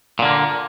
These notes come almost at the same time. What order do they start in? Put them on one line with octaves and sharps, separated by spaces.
A#2 D3 A#3